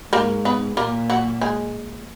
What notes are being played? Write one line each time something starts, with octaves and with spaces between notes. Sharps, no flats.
G#2 A#3 A#4
B3 B4
A#2 A#3 A#4
F#3 F#4
G#3 G#4